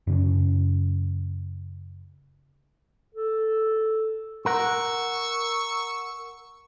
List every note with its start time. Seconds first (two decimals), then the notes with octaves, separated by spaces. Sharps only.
0.07 F#2 C#3 C#4
3.15 A4
4.46 A#4 F#5 C#6 E6